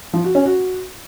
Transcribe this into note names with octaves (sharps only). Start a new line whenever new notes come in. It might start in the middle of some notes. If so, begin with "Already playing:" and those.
F3
F#4
C#4
F#4